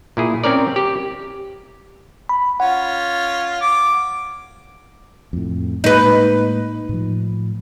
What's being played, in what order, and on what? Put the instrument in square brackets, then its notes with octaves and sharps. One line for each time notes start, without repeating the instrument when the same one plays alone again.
[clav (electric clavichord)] A#2 E4 G#4
C4 C#4 A#4 D5
G4
[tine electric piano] B5
[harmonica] C#4 F4 [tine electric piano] F#5
[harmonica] D6
[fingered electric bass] F2 A2
[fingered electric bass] A2 G#3 A#3 [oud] D#4 B4
[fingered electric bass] A2 F3